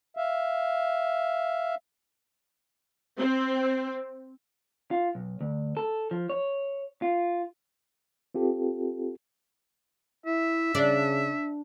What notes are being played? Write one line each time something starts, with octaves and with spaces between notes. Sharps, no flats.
E5 F5
C4
F4
B1
D2
A4
F3
C#5
F4
C4 F4 G4 A4
E4 E5
C#3 D4